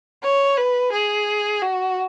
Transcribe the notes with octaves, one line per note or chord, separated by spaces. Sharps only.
C#5
B4
G#4
F#4